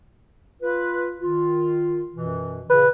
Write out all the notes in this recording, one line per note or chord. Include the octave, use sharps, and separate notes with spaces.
F4 B4
D#3 F4
F#2 B2 E3
A#2 C#3 B4